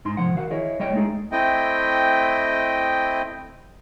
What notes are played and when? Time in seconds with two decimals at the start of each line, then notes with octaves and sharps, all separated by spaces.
0.05 G#2 D#4 C6
0.17 C3 F3 F#5
0.34 D#3 F#4 F5 F#5
0.51 E4 G#4 C#5 D#5
0.80 G3 C#5 D#5 G5
0.93 G#3 A3 D#4 G#4
1.32 A3 C4 E4 D#5 G5